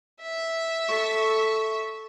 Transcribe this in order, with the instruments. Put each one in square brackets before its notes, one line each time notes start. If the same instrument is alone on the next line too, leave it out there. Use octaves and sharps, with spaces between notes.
[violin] E5
[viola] A4 C#6